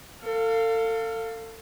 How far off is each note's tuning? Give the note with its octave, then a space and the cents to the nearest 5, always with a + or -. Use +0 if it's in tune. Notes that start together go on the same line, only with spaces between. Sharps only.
A4 +35 F5 +0